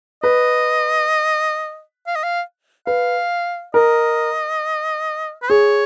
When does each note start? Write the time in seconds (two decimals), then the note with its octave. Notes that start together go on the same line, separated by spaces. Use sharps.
0.23 B4 D#5
2.07 F5
2.16 D#5
2.24 F5
2.87 B4 F5
3.74 A#4 D#5
5.43 B4
5.50 G#4 C#5